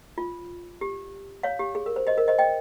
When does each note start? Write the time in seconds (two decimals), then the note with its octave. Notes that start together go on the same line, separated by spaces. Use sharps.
0.18 F4
0.81 G4
1.43 C#5 F5
1.59 G4
1.75 G#4
1.86 A#4
1.96 C5
2.07 C5 D#5
2.18 A#4
2.28 C5 D#5
2.38 D#5 G5